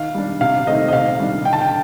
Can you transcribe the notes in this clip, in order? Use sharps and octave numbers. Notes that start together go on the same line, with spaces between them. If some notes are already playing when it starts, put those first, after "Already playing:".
Already playing: D#3 F5
G3 D4
C3 F5
D#3 A3 C4 D#5
D#5
C3 F5
D#3 G3 D4
D3 G5
A5
G5